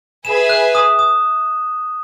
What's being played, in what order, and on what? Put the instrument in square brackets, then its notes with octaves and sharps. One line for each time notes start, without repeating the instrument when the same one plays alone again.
[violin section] G#4 B4 E5 G#5 [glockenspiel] E7
[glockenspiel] F#6
D#6
D#6